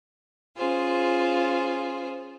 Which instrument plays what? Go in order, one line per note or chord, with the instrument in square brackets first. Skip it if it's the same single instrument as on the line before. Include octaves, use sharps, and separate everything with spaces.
[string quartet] C#4 F4 G#4 C5